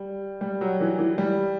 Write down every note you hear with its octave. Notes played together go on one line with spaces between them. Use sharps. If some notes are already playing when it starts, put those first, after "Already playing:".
Already playing: G3
G3
F#3
E3
E3
G3